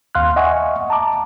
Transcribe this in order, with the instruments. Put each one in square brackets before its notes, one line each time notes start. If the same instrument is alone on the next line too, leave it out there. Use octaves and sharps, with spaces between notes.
[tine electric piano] D#2 F5 C6 F6 F#6
D#5 E5 F#5 G#5 C#6
A5 A#5 D6